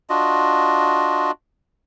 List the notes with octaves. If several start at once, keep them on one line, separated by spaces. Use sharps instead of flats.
D4 F4 F#4 D#5